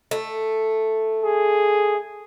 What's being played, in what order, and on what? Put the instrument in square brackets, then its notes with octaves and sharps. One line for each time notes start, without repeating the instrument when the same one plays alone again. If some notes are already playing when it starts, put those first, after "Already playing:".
[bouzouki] A3
[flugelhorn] G#4